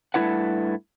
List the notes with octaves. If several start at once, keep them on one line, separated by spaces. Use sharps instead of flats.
G2 G#3 A3 E4 B4 F#5